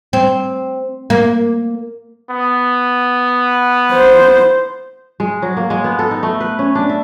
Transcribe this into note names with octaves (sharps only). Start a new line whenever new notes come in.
C4
A#3
B3
C5
G#3
F#3
A#3
G#3
B3
A4
D#4
A3
B4
C#4
D4
E5